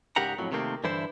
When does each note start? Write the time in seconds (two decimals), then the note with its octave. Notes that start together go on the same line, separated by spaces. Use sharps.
0.16 G#2 C#3 G4 A#4 F#5 A#5
0.39 F2 A2 F#3
0.52 C3 D#3 A3 A#3 C4
0.84 G2 D3 E3 E4 C5